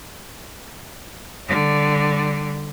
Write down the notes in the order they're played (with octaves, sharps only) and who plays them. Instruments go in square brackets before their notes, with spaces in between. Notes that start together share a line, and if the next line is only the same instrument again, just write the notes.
[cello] D3 G3